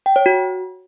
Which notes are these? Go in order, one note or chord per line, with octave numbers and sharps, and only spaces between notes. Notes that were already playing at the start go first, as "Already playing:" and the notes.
G5
C#5
F#4